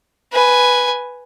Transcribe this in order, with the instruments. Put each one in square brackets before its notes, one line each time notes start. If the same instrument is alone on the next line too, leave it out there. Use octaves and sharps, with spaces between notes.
[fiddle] B4 G#5